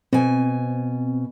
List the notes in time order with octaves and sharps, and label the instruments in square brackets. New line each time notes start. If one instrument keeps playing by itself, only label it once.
[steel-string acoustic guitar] B2 G#5 [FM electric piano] C4